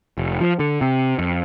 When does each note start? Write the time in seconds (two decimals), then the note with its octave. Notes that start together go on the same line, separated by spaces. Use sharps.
0.18 F1
0.41 F3
0.59 D3
0.81 C3
1.19 F2